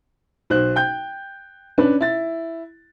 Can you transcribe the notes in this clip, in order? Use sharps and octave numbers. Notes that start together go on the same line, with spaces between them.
B1 C5 F#6
G5 G6
C#4 D4 B4
E4 A6